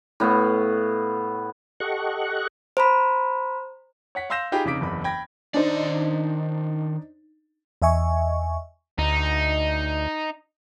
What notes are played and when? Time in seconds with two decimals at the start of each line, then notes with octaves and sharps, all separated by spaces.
0.20 A2 B3 F5 C#6
1.80 G4 A4 D#5 F#5 C#6 F#6
2.77 C5 A#5 B5
4.15 C#5 F#5 B6
4.30 F5 C6 E6 G6 A#6 E7
4.52 D#4 F4 G4 G#4 G5 B5
4.65 F1 C#3 D#4 D6 B6 D7
4.80 F#1 E2 B5
5.04 G5 B5 G#6 A#6
5.54 D#3 D4 D#4 C5 D5
7.82 E2 D#5 E5 G#5 C#6
8.98 D2 D#4